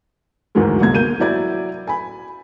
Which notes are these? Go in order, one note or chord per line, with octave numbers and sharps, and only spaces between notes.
D2 G#2 D#3 E3 F#3 G#3
G1 C2 F#3 G#6
A#3 G6 D#7
F#3 E4 D5 G#6
G#5 B5